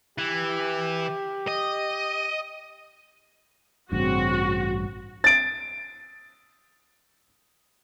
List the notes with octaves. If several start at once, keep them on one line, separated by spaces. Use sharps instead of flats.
E3 G4
D#5
A1 G2 C#3 C4 F#4
A6 D7